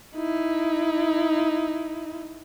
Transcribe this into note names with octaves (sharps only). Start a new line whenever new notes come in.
D#4 E4